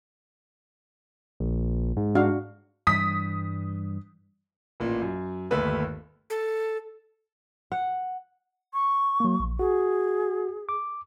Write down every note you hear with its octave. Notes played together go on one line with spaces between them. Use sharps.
A#1
G#2
D4 F#4 F5
G2 E3 G3 D#6 B6
A1 A#2
F#2
G1 D#2 A3 B4 E6
A4
F#5
C#6
F#3 A#3
A#1
F#4 G#4
D6